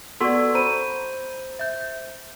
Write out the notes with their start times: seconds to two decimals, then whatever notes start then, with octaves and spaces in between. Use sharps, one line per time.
0.21 B3 F#4 A4 D5 C6
0.55 C5 A#5 B5 D#7
1.59 E5 G6